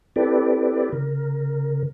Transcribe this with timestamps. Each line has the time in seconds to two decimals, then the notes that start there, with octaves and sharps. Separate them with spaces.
0.16 C4 E4 G4 A4 B4 D5
0.93 C#3 A#4